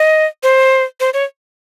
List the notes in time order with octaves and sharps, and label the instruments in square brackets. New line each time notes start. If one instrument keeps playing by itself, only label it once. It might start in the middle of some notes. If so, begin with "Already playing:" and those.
Already playing: [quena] D#5
C5
C5
C#5